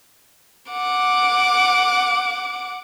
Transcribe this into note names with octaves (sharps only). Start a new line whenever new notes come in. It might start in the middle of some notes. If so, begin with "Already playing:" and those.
F#5 D6